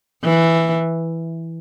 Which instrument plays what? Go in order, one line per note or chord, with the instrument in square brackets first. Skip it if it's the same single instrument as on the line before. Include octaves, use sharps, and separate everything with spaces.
[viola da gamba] E3